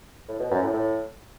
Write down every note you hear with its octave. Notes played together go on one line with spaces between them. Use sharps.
A2
B2
F#2
A2
A2